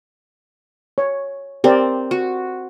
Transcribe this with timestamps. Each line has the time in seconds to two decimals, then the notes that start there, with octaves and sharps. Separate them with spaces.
0.98 C#5
1.64 C4 G4 A#4 D5
2.11 F#4